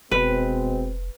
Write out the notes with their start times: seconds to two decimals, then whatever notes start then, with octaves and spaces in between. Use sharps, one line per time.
0.11 F1 B2 G#3 C4 B4